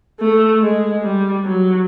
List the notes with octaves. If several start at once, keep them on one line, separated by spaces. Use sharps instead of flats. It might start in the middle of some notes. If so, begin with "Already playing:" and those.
A3
G#3
G3
F#3